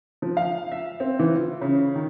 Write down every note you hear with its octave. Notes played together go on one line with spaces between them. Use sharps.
F3
F5
E5
C4
E3
F4
C#3
D#3